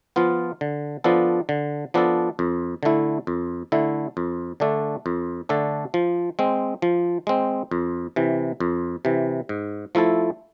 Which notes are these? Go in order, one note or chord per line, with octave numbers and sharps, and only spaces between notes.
F3 B3 F4
D3
F3 B3 D4 A4
D3
F3 B3 D4 A4
F2
D3 A3 E4
F2
D3 A3 E4
F2
D3 A3 D4 A4
F2
D3 A3 D4 A4
F3
G#3 C4
F3
G#3 C4
F2
C3 E3
F2
C3 E3
G#2
F3 A3 E4 A4